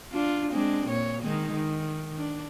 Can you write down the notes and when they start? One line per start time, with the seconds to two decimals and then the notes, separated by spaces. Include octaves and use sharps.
0.12 D4 F4
0.51 G#3 C4 D4
0.87 A#2 C#5
1.22 D#3 G#3 D#4
1.53 D#3
2.18 D4